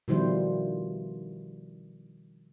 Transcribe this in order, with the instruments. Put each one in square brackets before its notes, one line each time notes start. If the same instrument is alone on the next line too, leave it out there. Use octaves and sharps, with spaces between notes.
[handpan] B2 D#3 F3 G3 E4 C5